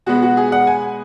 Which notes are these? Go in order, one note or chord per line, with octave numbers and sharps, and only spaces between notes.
B2 G#3 B3 F#4
F#4
G#4
F#5
G#5